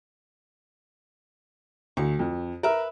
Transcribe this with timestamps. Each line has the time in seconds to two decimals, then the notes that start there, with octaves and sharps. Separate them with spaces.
1.97 D2 C#6
2.19 F2
2.63 A#4 B4 E5